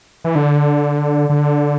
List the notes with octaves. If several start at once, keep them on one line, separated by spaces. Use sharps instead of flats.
E3
D3
D3